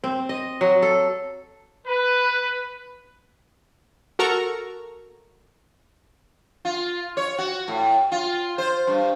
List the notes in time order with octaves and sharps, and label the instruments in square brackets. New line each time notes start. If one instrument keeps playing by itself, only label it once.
[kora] C4
D#5
F#3
A4
[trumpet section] B4
[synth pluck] F#4 A4 A#4 A#5 C#6
[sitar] F4
C#5
F#4
A2
F4
C5
G2